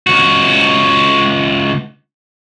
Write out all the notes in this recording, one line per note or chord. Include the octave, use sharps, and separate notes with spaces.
C#2 F#4